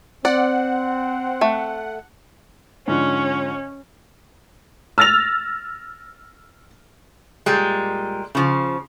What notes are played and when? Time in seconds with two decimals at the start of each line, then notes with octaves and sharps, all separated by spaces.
0.25 C4 D5 F#5
1.41 A3
2.88 G#2 D3 F3 C#4
4.98 E6 F6 A6 A#6 F7
7.46 A#2 G3 G#3
8.35 C#3 F3